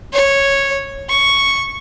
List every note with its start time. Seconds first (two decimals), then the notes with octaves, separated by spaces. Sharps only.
0.13 C#5
1.09 C#6